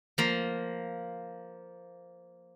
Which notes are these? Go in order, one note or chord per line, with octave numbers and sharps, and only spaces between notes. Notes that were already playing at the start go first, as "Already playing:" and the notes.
F3 A#3